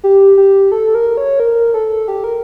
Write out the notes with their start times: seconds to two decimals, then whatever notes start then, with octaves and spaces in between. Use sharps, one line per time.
0.04 G4
0.38 G4
0.72 A4
0.95 A#4
1.17 C#5
1.40 A#4
1.74 A4
2.08 G4
2.24 A#4